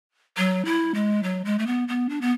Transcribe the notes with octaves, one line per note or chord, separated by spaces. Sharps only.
F#3
E4
G#3
F#3
G#3
A3
B3
B3
D4
B3